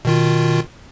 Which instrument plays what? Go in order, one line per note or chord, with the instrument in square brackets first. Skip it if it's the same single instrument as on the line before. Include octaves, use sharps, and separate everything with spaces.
[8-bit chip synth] B2 D#3 F4